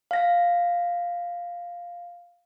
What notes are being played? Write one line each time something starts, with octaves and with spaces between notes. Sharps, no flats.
F5 A#6